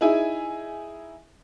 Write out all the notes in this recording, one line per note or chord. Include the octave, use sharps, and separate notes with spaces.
D#4 E4 G#4 E5 G#5